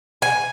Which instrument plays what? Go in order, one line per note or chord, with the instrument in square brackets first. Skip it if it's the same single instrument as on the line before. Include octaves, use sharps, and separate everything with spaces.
[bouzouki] G#5